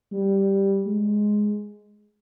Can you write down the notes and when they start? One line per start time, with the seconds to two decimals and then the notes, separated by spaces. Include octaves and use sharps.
0.12 G3
0.86 G#3